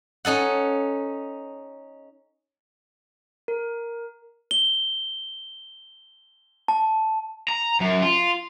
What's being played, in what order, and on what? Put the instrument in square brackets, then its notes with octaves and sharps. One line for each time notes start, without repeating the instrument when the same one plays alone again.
[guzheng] C#4 D#4 A4 F#5
[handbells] A#4
[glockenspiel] G7
A5
[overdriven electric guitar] A#5
F#2
F4